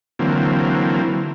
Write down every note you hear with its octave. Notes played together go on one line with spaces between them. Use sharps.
D3 E3 F#3 A#3 C4